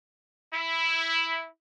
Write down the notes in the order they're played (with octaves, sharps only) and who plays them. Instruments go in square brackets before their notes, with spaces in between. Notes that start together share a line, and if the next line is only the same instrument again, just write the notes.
[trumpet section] E4